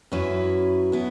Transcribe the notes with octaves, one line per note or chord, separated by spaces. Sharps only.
F#2 F#3 C#4 E4 B4
B2 B3 E4